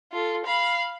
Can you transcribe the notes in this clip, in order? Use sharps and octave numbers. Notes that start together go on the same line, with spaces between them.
F4 A4
F5 B5